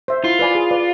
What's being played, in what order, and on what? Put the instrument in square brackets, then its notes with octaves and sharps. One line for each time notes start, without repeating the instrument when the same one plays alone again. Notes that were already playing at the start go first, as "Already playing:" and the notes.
[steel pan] C5 E5
[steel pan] E4 [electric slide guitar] F4
[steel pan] B4 D5 G#5 B5
G#4
B4 D5